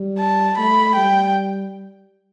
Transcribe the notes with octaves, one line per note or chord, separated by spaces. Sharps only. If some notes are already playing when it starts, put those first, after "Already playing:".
Already playing: G3
A5
A3 B5
G3 G5